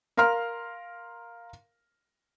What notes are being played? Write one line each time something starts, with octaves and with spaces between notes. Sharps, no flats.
A#4 F5 A#5 C6 F6